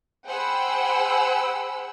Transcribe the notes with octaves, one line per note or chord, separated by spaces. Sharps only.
G#4 C5 F#5 G5 B5 E6